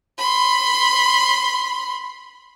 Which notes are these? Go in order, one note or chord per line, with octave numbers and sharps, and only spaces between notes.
B5 C6